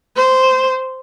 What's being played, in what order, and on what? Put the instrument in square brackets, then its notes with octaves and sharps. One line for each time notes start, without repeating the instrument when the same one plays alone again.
[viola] C5